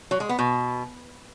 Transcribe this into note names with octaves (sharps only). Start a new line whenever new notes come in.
F#3
G#3
B3
B2